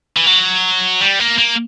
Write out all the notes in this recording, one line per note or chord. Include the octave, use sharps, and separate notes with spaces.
E3
F#3
G3
A#3
A#3